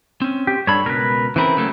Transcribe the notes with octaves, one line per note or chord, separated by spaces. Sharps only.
C4 C#4
G4
G2 D4 A4 C#5 B5
C#2 B2 A#4 B4
C#3 E3 C4 A#4 B5
C#3 F#3 A3 A#3